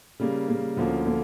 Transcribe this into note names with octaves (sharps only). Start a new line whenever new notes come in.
C#3 G3 A#3
C#3 G3 A#3
D2 D3 F3 A#3 C#4
D3 F3 A#3 C#4